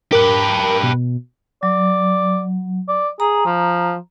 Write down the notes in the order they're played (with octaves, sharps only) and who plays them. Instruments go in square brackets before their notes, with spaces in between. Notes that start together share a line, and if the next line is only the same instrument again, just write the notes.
[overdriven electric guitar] G4 B4 [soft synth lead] A#4
[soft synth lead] B2
[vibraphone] F#3 [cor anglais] D5
[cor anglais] D5
[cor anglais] G#4 [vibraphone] A#5
[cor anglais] F3